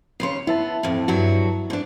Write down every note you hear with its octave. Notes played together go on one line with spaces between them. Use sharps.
D#2 C#3 C#5 C6 C7
B3 E4 E5 A5
F2 A2
G2 F#3 F#4
G#2 D4